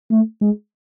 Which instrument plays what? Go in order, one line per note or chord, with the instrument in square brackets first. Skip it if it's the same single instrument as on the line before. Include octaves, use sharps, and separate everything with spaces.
[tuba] A3
G#3